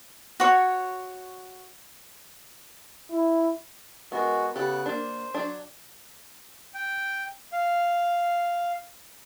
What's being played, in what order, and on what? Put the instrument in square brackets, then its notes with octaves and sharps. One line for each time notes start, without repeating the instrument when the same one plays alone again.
[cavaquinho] F#4 C#5
[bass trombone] E4
[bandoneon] G#3 F#4 [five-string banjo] B3 A#4
[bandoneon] C#3 B3 F#6 [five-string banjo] G4 A4
[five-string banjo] A#3 D4 [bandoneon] C5
[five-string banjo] F#3 D4
[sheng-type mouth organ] G5
F5